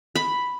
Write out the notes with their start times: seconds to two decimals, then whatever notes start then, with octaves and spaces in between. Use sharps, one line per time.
0.15 B5